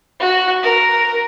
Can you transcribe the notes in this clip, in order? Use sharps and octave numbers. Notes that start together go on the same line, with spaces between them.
F#4
A#4